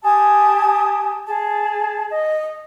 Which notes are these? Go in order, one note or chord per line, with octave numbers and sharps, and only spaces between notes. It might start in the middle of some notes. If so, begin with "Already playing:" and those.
G4 G#5 A5 D#6
G#4 A5
D#5